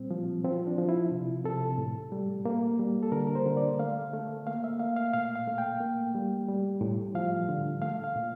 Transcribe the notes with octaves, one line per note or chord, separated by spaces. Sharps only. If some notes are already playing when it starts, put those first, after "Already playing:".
Already playing: A#2 G3 C4
F3
F3 C4
D4
F3
E4
C3
C3 A4
A2
G3
A#3
G3
A4
D3 A#4
A#4
C5
D3
D5
A3 F5
A3
A#3 F5
E5
A#3 F5
F5
A#2 F5
F5
A3
G5
A#3
G3
G3
A2
F3 F5
D3
A3 F5
F5
A#2